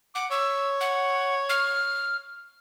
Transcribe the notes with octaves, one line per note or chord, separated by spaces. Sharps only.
F#5 D6
C#5 E6
F#5
F6